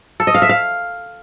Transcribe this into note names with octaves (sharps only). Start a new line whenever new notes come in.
A4
D#5
F5
E5
F5